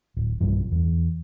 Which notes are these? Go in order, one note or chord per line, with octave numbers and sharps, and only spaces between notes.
D1
B1 G2 F3
E2